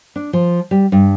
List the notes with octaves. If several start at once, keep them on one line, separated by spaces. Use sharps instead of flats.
D4
F3
G3
G2